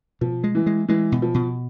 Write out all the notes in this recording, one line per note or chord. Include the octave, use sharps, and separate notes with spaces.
B2 F3
G#3
E3
G#3
E3 G#3
B2
F3
B2